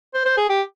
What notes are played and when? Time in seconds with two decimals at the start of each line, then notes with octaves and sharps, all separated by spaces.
0.14 C5
0.26 C5
0.37 G#4
0.49 G4